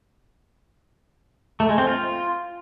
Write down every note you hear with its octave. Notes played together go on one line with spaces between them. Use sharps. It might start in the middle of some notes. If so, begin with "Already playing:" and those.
A3
G#3
C4
F4